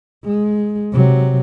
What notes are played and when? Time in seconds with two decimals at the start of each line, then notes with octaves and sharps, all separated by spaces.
0.25 G#3
0.92 C3 F#3